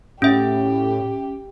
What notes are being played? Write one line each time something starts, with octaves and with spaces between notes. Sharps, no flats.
A2 C#4 G4 E5